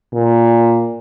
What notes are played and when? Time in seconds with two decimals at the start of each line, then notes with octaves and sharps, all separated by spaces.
0.13 A#2